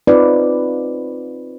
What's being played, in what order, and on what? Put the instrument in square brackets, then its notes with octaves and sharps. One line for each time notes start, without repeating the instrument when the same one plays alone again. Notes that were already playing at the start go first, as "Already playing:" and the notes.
[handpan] C4 D#4 F4 B4 D5